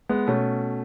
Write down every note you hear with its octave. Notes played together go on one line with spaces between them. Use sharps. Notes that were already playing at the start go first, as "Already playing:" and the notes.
G#3 B3
B2 A3 C#4